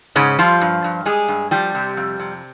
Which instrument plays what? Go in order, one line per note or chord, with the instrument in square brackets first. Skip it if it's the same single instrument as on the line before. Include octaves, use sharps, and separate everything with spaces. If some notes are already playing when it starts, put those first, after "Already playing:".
[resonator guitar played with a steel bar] G#2 C#3 C#4
F3 G3 F4
G2
G2
G3 G#3 G#4
G2
F3 G3 G4
C3
F2
C3